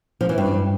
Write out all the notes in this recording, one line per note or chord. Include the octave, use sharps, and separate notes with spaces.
F3
E3
G2